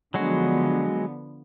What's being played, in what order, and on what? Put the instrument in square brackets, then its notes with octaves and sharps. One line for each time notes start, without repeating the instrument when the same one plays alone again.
[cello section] D3 F3 B3 [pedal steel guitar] F#3 G#3 F#4